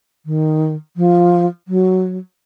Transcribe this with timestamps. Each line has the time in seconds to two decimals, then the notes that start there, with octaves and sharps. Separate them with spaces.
0.26 D#3
0.97 F3
1.68 F#3